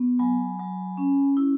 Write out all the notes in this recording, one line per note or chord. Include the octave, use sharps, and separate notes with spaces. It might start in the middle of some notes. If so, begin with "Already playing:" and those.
Already playing: B3
F#3 G#5 B5
F#3
C#4
E4